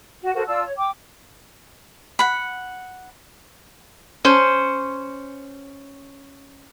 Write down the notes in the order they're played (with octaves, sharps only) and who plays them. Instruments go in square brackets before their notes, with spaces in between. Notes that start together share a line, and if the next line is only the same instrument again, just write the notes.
[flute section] F#4
F#4 A4 A#4 C5
F4 D5 A5 E6
C#5
G5 D6
[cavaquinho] F#5 B5
[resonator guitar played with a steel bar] C#4 C5